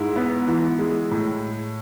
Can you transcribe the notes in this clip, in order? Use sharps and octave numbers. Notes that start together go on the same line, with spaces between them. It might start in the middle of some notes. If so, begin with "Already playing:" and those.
Already playing: G#2 G#3 E4
B3
E3
G#3
A2